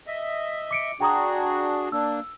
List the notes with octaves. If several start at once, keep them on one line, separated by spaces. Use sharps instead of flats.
D#5 E5
D6 C#7 D7
D4 F#4 G#4 G5 A#5 D#6
A#3 D4 E6